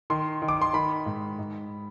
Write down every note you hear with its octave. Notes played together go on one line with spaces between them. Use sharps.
D#3 C6
D#3
D6
C6
D#3 B5
G#2
G#2